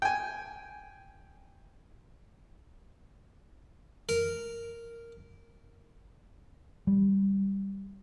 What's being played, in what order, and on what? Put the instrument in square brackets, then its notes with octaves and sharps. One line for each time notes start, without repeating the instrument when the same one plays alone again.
[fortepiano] G5 G#5
[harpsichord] A#4
[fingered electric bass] G3